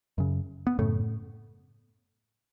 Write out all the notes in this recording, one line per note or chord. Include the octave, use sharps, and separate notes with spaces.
F#2 C#3
B3
F#2 A2 C#3 A3